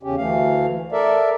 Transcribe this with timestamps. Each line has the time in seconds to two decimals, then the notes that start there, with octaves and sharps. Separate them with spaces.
0.03 E2 C#3 C#4 G4
0.17 D2 E3 A3 F5
0.92 A4 A#4 D5 E5